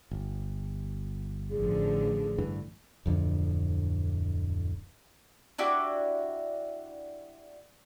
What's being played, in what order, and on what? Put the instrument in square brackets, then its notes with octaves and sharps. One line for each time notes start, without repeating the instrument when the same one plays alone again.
[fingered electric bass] G1
[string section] A1 D3 F3 [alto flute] G#4
[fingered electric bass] G2 D3 E3
D1 F2 D3
[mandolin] D4 E4 F#4 G4